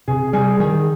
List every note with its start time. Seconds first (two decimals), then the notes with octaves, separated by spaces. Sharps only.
0.08 C3 G#4
0.33 G3 G#4
0.60 D#3 G#4